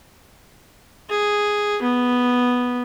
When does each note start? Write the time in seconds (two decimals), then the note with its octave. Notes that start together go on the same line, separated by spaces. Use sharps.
1.10 G#4
1.82 B3